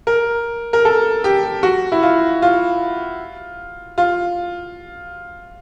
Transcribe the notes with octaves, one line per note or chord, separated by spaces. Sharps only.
A#4
A#4
A4
G4
F#4
E4
F4
F4
F4